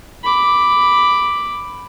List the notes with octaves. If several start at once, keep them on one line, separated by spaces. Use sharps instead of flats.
B5 D6